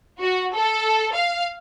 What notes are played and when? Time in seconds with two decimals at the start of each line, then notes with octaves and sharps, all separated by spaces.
0.20 F#4
0.54 A4
1.14 F5